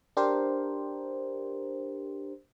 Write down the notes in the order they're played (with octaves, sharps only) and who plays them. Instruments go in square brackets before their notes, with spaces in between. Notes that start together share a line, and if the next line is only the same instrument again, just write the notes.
[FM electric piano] D4 G4 A#4 C5